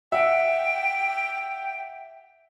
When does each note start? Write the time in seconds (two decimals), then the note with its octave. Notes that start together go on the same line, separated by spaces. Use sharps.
0.12 E5 F#5 G5